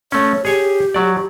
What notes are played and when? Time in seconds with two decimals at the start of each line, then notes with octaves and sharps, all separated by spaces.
0.12 A3 C#4 C#5
0.45 G4 G#4 C#5 G#5
0.94 F#3 D5